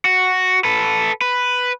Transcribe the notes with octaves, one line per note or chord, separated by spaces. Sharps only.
F#4
A4 B4
B4